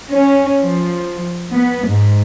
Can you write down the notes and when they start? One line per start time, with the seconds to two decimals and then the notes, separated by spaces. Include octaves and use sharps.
0.10 C#4
0.61 F3
1.52 B3
1.86 G#2